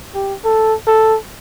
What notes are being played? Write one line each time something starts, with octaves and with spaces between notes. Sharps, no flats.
G4
A4
A4